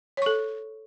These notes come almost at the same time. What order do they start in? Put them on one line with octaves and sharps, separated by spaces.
C#5 C#6 A4